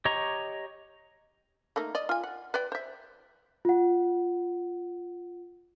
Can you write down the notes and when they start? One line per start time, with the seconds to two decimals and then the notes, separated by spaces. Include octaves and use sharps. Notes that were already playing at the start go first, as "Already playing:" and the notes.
0.05 G4 C#5 D#5 A#5 C#6
1.76 A3 A#3 D#4
1.95 D5 D#5
2.09 F4 G#5
2.24 F#5
2.54 B4 D5 G5
2.72 C5 E5
3.65 F4 F#5